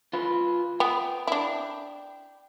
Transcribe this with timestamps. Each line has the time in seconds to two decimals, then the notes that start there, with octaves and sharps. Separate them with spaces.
0.13 F4 B4
0.80 B3 G5
1.27 D4 E4